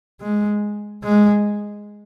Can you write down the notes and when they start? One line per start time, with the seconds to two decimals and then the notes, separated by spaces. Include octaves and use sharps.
0.21 G#3
1.04 G#3